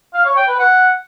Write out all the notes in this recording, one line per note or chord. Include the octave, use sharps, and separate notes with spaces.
F5
C#5
G5
B4
F#5